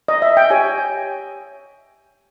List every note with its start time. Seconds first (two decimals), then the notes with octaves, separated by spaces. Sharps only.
0.08 D#5
0.22 E5
0.37 G5
0.50 G4 C#5 G#5